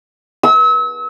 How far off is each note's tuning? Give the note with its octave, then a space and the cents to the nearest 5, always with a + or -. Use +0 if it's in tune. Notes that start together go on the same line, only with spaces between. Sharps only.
E6 -35